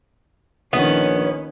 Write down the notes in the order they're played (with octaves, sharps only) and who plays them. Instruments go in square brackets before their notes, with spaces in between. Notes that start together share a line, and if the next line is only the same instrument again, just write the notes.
[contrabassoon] A#1 [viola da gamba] D#3 C#4 [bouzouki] B3 [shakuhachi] C#5